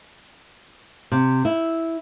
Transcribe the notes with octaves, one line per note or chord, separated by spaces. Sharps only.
C3
E4